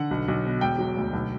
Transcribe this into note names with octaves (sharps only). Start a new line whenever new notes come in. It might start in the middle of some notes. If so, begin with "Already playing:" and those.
Already playing: D3 F#5
B1
B1
B2
E1 G5
F#3
D2
B1